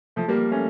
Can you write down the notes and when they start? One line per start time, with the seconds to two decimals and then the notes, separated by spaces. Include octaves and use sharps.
0.16 F3 A3
0.28 G3 A#3
0.51 A3 C#4